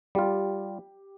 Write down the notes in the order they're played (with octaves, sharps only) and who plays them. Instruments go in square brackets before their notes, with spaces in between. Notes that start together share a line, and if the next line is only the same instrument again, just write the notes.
[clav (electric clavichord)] G3 F4 [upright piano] G4